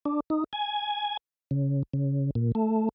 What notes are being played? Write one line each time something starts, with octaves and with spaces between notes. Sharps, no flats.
D4
D#4
G#5
C#3
C#3
A#2
A3